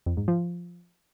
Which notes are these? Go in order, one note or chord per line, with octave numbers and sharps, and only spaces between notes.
F2
G#2
F3